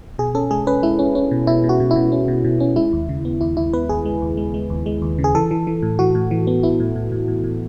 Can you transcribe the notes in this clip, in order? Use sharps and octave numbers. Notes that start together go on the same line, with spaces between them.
B2 G#4
C#4 A4
G#3 G#4
C#4 B4
G#3 E4
C#4
C#4
B2
B2 E4
B2
F#4
B2
E4
B2
C#4
B2
B2
C#4
G#3 E4
D#2
C#3
B3
D#2 E4
D#2 E4
B3 B4
D#2 G#4
G#3
D#2
G#3
G#3
D#2
G#3
D#2
C#3
G#4
E3 A4
E3
E3
A2
E3 F#4
A2
E3
B3
B3 E4
A2
A2
A2
A2
A2